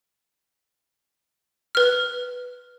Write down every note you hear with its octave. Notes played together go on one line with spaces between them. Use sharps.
B4 F6